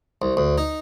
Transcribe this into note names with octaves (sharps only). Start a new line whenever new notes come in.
C2
D2
D#4